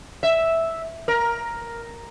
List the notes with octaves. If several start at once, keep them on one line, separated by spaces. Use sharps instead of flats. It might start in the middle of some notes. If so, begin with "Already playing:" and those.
E5
A#4